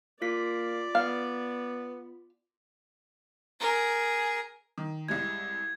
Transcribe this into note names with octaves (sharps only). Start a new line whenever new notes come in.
A#3 F4 D5 B6
B3 F5
G#4 A#4
D#3
C2 G3 G#3 G#6